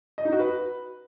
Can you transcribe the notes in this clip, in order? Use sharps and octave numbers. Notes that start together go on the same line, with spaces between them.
D#5
D#4
F#4
B4